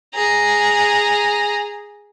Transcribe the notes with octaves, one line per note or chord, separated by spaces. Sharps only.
G#4 A#5